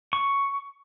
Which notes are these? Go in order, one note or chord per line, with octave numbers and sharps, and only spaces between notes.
C#6